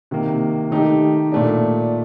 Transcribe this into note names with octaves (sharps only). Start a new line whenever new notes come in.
C3 D#3 A#3
D#3 A3 D#4 G4
A#2 A3 D4